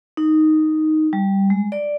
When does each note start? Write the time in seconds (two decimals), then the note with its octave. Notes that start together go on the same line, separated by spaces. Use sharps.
0.17 D#4
1.13 G3
1.50 G#3
1.72 D5